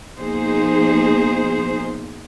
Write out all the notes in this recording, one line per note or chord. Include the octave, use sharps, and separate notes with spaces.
B2 F3 A#3 D#4 G#4 C5